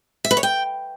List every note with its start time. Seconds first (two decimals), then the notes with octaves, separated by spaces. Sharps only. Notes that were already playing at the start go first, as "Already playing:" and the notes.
0.25 E5
0.31 B4
0.37 C#5
0.43 G5